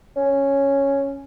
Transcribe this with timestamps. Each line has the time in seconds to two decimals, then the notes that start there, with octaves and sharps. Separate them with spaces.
0.16 C#4